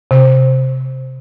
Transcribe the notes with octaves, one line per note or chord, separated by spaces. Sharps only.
C3